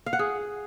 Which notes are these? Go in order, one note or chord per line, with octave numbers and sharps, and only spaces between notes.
F5
F#5
G#4